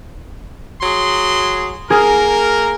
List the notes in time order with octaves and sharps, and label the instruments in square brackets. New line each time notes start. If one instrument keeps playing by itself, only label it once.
[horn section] F#3 G#4 C6
[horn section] A#3 A#4 [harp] G#4